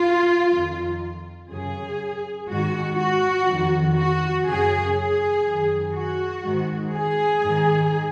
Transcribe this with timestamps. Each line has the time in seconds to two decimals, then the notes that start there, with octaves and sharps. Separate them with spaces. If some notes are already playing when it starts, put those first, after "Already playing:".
Already playing: F4
0.51 F2 D#3
1.50 F#2 C#3 G#4
2.50 G#2 D#3 F#4
2.99 F#4
3.49 F2 D#3
3.98 F#4
4.47 F#2 C#3 G#4
4.96 G#4
5.45 F#2 D#3
5.95 F#4
6.44 G#2 D#3
6.93 G#4
7.43 G#2 D#3